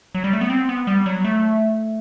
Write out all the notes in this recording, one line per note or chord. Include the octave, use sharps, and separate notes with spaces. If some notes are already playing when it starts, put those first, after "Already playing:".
F#3
G3
A3
B3
C4
B3
G3
F#3
A3